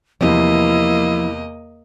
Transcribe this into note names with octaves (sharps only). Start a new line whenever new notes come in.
E2 C3 F3 G3 A#3 E4 C5 D#5